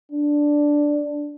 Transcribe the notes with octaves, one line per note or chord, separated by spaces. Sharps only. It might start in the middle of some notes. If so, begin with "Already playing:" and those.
D4